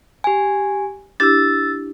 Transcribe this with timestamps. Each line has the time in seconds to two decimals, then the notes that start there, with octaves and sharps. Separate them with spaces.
0.24 G4 G#5
1.20 D4 E4 G4 E6 A6